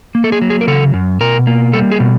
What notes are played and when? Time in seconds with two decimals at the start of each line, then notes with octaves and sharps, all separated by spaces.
0.15 A#3
0.24 A4
0.32 G#4
0.42 F#3
0.50 G#4
0.61 A#4
0.67 C#3 A4
0.94 F#2
1.21 B2 A#4
1.47 A#3
1.73 G3 A4
1.91 G#4
2.00 B2